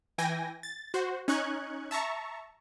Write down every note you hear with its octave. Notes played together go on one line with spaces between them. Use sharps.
E3 G5 G#5 A#6
A6
F#4 C5
C#4 D#4 C#6 F#6 G#6
E5 A5 A#5 C#6